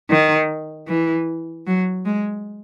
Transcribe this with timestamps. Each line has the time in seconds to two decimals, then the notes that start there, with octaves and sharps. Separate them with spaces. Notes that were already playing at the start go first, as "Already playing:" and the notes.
0.10 D#3
0.88 E3
1.67 F#3
2.06 G#3